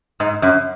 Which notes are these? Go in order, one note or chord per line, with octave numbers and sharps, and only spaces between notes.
G#2
F#2